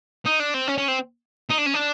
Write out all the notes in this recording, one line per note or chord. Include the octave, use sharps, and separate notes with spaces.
D#4
D4
C4
C#4
C#4
C4
D#4
D4
C#4
D4